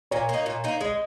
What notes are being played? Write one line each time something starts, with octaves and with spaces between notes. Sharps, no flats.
A#2 C#5
A#3 D#4
A#2
A#3 D#4
G#3 D#5